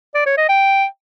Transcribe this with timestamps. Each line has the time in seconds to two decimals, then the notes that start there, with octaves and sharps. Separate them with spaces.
0.15 D5
0.26 C#5
0.38 D#5
0.49 G5